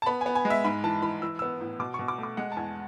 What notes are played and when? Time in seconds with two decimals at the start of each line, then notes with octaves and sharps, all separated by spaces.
0.02 A5
0.06 B3 B5
0.21 B3 G#5
0.35 G#5
0.45 G#3
0.50 E5
0.64 G#2 B5
0.84 E3 A5
1.02 E3 B5
1.22 E3 E6
1.39 B3 E6
1.61 A2
1.79 B2 D6
1.94 C#6
1.99 B2
2.08 D6
2.18 A3
2.23 D6
2.37 G#3 F#5
2.52 A5
2.57 E2 G#5